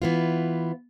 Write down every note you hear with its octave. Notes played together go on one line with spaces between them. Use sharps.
E3 B3 F4